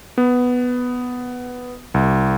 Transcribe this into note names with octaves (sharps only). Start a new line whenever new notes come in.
B3
C2